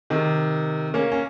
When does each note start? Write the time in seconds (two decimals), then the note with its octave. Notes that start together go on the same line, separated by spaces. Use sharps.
0.10 C3 D#3
0.94 A#3 C#4
1.12 C#4